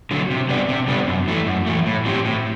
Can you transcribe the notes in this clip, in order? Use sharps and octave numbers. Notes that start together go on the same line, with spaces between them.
D3 F#3
C3
G3 B3 D4
C3
G3 B3 D4
F#2
E3 A3
F#2
E3 A3
A2
F#3 C4 G4
A2